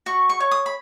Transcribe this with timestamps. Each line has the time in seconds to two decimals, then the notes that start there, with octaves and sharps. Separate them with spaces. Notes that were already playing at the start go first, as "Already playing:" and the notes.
0.06 F#4 C#6
0.29 C#6
0.40 C#5
0.51 D#6
0.66 B5